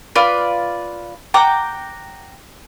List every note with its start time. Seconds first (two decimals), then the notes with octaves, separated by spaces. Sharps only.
0.16 F4 B4 D5 F6
1.34 F#5 G5 A#5 D6